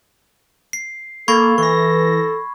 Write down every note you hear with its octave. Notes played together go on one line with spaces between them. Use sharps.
C7
A#3 A4 B5 C#6 G#6
E3 A4 C#6 A#6